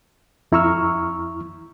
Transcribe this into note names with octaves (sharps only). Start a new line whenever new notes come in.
F2 E4 A#5 C#6 E6 F6